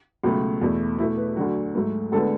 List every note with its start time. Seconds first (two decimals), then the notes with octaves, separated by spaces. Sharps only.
0.24 C#2 B2 F#3 A3
0.61 E2 B2 A3
0.99 B2 A3 E4
1.17 B4
1.36 D2 D3 F#3 F#4
1.75 G#2 F#3 A3
2.12 D2 D3 G#3 B3 A4